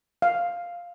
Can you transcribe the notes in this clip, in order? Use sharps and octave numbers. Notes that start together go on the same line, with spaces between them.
F5